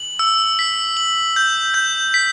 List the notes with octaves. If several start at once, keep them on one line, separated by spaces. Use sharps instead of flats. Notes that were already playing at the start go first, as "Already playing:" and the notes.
Already playing: F#7
E6
B6
F#7
G6
G6
B6